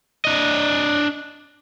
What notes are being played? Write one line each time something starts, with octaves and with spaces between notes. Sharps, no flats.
D4 D#5